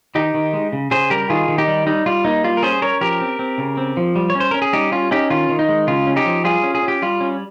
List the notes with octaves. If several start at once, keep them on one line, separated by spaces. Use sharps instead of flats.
D#3 D#4 G4
D#3
G#3
C#3
C#3 G#4 C5
G3 G4 A#4
D#3 F4 G#4
D#3
D#4 G4
G3
G3 D#4
G3 F4
A#3 D#4
G3 F4
A#4
C#4 G#4 C5
C#4 A#4 C#5
F3 G4 A#4
C4
C4
C#3
C4
F3
G3
C#5
C#4
C5
C#4 A#4
G#4
G3 D#4 G4
C#4 F4
C#4 D#4 G4
D#3 F4
D#3
D#4
G#3
C#3 F4
C#4
D#4 G4
F3
G3 F4 G#4
C#4
G#4
C#4
G4
G3 F4
C#4